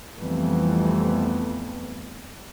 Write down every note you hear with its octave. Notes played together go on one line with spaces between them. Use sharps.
F2 E3 G3 A3 B3